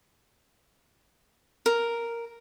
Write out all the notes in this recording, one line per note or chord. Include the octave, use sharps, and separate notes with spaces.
A#4